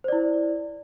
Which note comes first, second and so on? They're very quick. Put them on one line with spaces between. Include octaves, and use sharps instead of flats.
C5 D5 E4